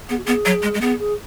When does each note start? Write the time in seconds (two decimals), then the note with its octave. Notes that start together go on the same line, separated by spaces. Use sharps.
0.09 B3 G#4
0.17 F#4
0.24 B3 G#4
0.46 F#3
0.63 G#3
0.74 G#3
0.81 B3 G#4
0.98 G#4